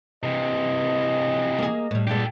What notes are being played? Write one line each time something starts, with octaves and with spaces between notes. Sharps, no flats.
C3 E3 D#5
A#3 G#4
A2 G3
G2 A#2 G#3 G4 A4